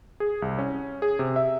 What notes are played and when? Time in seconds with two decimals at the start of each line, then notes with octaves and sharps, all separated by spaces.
0.20 G#4
0.42 C2
0.58 C#4
1.02 G#4
1.19 C3
1.36 E5